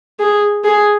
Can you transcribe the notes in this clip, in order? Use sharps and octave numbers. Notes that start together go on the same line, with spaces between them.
G#4
G#4